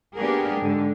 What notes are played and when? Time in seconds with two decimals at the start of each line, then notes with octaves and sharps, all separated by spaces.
0.16 A#3 B3 D4 G4 G#4 A#4
0.60 G#2 D3